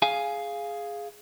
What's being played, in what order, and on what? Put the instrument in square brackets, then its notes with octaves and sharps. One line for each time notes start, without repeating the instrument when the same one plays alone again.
[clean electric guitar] G#4 F5 G#5